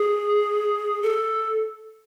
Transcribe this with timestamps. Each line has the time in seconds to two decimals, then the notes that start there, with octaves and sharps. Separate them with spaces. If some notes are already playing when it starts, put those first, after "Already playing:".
Already playing: G#4
1.03 A4